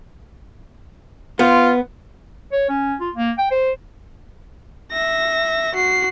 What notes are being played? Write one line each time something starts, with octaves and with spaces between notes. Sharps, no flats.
B3 F4 C5
C#5
C#4
F4
A#3
G5
C5
E5 A#6
F#4 C7